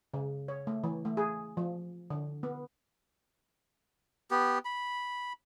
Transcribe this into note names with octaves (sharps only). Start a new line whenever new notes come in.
C#3
C#5
A3
E3
A3
G#4
F3
D3
B3
B3 G4
B5